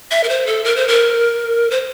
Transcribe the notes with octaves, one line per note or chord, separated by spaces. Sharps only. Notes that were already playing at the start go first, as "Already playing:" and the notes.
E5
A#4
C5
A4
A#4
C5
A#4
C5